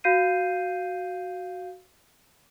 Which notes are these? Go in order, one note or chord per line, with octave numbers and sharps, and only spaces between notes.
F#4 F5 G6 C7 D#7